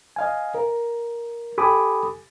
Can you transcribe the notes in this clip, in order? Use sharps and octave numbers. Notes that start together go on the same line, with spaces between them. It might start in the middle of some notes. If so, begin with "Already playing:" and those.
D#5 F5 G#5
A#4
G4 A4 G#5 B5 D6 D#6